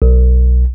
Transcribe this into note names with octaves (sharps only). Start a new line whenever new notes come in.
B1